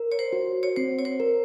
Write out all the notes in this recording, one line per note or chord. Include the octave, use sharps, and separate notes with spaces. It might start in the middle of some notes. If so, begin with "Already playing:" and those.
Already playing: A#4
C#5
C5
F#4
C#5
C4 C5
C#5
C5
A#4